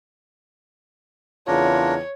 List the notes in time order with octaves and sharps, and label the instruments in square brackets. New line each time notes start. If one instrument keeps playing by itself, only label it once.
[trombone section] E2 C#3 F4 [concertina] D4 A#4 [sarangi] C#5